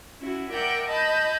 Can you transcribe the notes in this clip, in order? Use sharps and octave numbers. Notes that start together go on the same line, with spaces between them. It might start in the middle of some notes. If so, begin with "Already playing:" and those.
C#4 E4 F#4
A#4 D5 E5 F#5 G5
D#5 A5 B5 G6